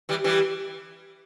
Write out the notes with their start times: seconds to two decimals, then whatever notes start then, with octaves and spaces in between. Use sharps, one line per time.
0.09 E3 G3
0.24 E3 G3